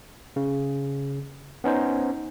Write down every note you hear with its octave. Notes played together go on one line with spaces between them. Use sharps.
C#3
B3 C#4 D#4 C5